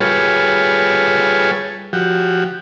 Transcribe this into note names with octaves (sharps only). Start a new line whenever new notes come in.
G3 F4 G#4 A4 B4 C#5
F3 F#4 G4